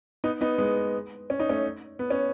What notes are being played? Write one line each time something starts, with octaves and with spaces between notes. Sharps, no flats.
B3 D#4
B3 D#4
G#3 B3
C#4
D#4
A3 C#4
B3
C#4